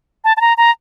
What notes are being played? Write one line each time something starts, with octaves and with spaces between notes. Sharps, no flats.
A5
A5
A#5
A#5